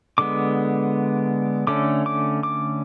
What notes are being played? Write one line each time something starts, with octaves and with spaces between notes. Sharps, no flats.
D3 G#3 B3 D6
D3 A3 C#4 D6
D6
D6